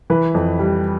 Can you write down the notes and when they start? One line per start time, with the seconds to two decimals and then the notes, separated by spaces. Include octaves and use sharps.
0.10 E3 B4
0.34 F2
0.59 G3